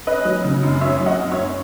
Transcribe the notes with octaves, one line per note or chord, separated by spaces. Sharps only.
C#4 B4 D#5
F#3
C#3
F#2
F#3 C#5 E5
F#3
D#5 F#5
F#2
C#5 E5
F#2